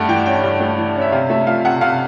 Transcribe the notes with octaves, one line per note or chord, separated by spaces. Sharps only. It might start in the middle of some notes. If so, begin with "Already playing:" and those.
Already playing: G2 A3 F#5 A5
E3 G5
C#4 G5
G2
A3
E3
C#4
E5
C3 F5
A3 E5
F3 F5
C3 F#5
C3 F5